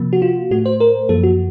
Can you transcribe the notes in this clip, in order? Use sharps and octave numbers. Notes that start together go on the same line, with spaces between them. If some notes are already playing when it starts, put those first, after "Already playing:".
Already playing: C3 F3 A#3
F#4
F4
A2 A3 F#4
C5
A#4
F#2 F3 A#3 A4
F#4